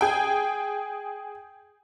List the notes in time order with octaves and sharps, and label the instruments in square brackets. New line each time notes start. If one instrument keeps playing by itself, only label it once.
[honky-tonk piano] G#4 G5